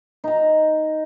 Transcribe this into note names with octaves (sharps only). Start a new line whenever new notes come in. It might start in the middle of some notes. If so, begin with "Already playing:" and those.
D#4 A#5